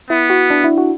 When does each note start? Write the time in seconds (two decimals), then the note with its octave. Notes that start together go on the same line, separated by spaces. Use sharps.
0.10 B3 E4
0.30 F#4
0.50 D4
0.64 E4
0.78 F#4